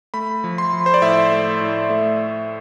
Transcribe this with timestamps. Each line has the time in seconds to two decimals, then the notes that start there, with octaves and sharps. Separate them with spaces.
0.14 A3 B5
0.44 F3
0.58 C6
0.73 F3
0.86 C5
0.94 D5
1.02 A2 E5
1.32 A3
1.61 A2
1.90 A3